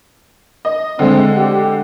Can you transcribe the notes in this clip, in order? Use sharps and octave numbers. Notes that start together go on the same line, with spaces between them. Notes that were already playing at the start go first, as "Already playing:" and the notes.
D#5
D3 G#3 C4
G4